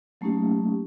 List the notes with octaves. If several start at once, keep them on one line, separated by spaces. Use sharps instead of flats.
F#3 A3 A#3 C#4 D#4 G4